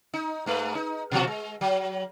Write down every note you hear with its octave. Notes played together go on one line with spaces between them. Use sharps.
D#4
G#2 A3 B4
D#4
B2 F3 F#4
G#3
F#3